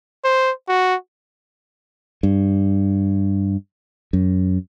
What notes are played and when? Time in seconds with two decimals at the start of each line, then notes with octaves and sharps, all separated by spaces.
0.24 C5
0.68 F#4
2.23 G2
4.13 F#2